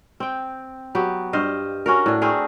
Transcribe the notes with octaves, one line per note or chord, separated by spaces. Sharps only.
C4 G5
F#3 B3 G4
G2 C5 D#5 F5
C#4 F#4 A#4
A2 D4
A3 C4 G#4 A#4